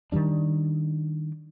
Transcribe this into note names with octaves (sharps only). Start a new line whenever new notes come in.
D#3 E3 G3 D4